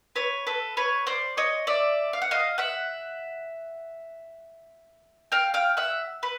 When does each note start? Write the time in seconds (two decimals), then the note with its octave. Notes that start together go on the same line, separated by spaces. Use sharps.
0.16 B4 C#5
0.47 A4 B4
0.77 B4 C#5
1.07 C5 D5
1.37 C#5 D#5
1.67 D5 E5
2.13 F5
2.22 F#5
2.31 D#5 F5
2.58 E5 F#5
5.32 F5 G5
5.54 F5 G5
5.77 E5 F#5
6.23 B4